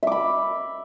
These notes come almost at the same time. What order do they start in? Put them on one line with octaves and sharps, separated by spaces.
E5 D6 B5